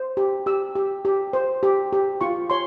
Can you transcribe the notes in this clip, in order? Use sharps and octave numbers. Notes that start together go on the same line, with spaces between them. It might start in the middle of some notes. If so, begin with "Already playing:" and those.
Already playing: C5
G4
G4 E6
G4
G4
C5
G4
G4
F4 C#6
C#5 C6